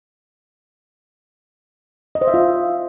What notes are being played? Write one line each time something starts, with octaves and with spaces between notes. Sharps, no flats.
D#5
C5
E5
F4